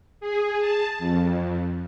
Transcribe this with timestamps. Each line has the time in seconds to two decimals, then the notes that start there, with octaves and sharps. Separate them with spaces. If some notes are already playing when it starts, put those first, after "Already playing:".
0.21 G#4
0.60 A5
0.99 F2